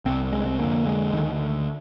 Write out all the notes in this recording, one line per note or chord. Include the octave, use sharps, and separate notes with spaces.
C2 C3 C4
G#3
C4
F2 D3 A#3
G#3
D2 D3 D#3